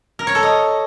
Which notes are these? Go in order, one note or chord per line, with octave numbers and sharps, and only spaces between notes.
A#4
C#5
A4
D#5